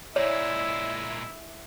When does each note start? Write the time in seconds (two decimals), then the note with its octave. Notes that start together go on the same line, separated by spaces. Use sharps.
0.16 A#2 G#3 E4 C#5 D5